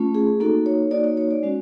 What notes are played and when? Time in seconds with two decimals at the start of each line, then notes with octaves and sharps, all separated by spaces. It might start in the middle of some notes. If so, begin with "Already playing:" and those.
Already playing: A3 C#4 F4
0.15 G#4
0.40 A#3 D#4 F#4 A4
0.66 C#5
0.91 A#3 D#4 F#4 D5
1.04 C#5
1.17 C#5
1.31 D5
1.43 G#3 C#4 F#4